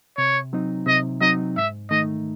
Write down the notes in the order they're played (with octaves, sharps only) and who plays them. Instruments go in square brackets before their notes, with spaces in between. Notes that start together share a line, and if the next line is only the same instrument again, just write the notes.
[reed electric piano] C3 [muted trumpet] C#5
[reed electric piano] F#3 C4 D#4
[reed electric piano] C3 [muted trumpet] D#5
[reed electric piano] F#3 C4 D#4 [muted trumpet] D#5
[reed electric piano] G#2 [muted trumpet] E5
[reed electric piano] D#3 A3 D#4 [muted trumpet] D#5